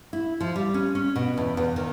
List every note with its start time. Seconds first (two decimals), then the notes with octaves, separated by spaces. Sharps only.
0.13 E4
0.41 F3
0.56 G3
0.74 C#4
0.95 C#4
1.16 B2
1.38 E2
1.57 E2
1.76 D#3